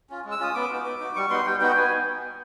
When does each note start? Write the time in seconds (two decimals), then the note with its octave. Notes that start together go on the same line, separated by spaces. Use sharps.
0.10 C#4 F4
0.25 G#3
0.31 E6
0.40 C#4 F4 D#6
0.55 B3 D6
0.70 D#4 F#4
0.85 B3
1.00 D#4 F#4
1.16 G3 C#6
1.30 B3 D#4 F#4 C6
1.46 G3 G5
1.61 B3 D#4 F#4 G5
1.76 B3 G#5